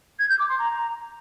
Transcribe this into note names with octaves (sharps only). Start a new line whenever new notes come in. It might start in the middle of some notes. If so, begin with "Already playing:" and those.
G#6
G6
D6
C6
A#5